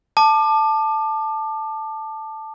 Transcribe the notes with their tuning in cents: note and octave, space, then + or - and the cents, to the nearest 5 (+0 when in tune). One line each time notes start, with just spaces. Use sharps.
A5 +0 D6 +30